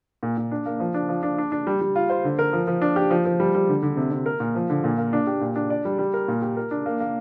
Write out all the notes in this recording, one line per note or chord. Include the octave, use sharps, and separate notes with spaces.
A#2
A#2
D4
A#3
F3
D4
F3
D4
D4
D4
G3
G3
F4
C5
D3
A#4
F3
F3
D4
G4
F3
F3
G3
G3
D3
D3
C3
C3
A#4
A#2
F3
D3
A#2
A#3
D4
G4
A#2
D4
D5
G3
G3
A#4
A#2
G4
A#4
D4
A#3
A#3